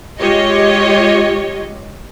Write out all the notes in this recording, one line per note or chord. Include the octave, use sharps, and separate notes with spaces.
G#3 F4 G4 C#5 D#5